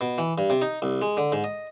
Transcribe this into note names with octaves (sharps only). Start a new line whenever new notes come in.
B2
E3
G2
C3
D#4
C2
G#3
D3
G#2
D#5